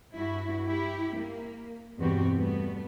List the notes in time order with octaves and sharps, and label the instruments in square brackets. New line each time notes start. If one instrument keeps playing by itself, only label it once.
[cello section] G2 E4 F#4
E4 G4
A#3
E2 G2 B2 C4 F#4 G4
G3 A3 B3